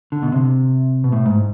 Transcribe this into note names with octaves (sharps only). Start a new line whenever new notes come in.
D3
B2
C3
B2
A2
G#2